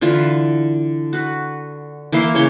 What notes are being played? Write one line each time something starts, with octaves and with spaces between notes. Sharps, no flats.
D3 E3 F4 B4
F#4 B4
E3 A#3 E4 C6
C#3 E3 C#5 C6